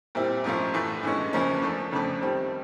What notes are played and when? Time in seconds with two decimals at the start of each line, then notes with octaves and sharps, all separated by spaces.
0.15 A#2 G3 C4 E4
0.44 G#2 F3 A3 C#4 F4
0.74 A2 E3 A3
1.03 G2 E3 G#3 C#4
1.33 E2 C#3 F3 A#3 C#4
1.62 F3 A3 D4
1.92 F2 C#3 F3 A3 D4
2.21 D#3 G3 C4